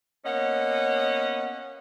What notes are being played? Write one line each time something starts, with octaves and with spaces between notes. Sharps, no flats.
A#3 B3 C#4 D#5 F#5